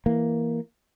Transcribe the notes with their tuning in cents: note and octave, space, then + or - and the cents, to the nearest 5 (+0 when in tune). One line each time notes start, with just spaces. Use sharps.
E3 +0 A#3 +0